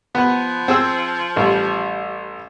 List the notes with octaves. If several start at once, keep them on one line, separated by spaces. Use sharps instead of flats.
F3 B3 F#6
C4 G#4 E6
A1 G3